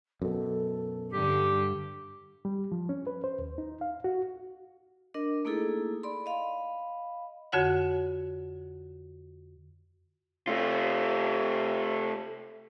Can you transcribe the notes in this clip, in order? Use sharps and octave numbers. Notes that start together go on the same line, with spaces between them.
F#2 B2 A4
G2 D3 G4
G3
F3
C#4
B4
C5
D#2
D#4
F5
F#4
D4 A#4 D#5
A3 A#3 D#4 E4 G#4 A4
D5 B5 C6
D#5 F5 B5
F2 D3 F#4 C#5 F#5
C3 A3 F4